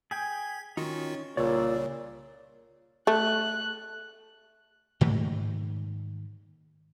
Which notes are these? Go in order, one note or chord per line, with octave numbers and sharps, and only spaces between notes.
G#4 G5 G#5 G#6 B6
D#3 C#4 D#4 F4 F#4
C2 A#2 C#3 C#5 D5 E6
A3 F#6
G#2 D#3 A3 A#3